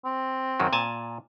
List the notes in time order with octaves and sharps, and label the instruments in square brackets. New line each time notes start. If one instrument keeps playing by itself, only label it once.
[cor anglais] C4
[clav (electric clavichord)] F#2 D#3 F#3
A#2 G#5 A5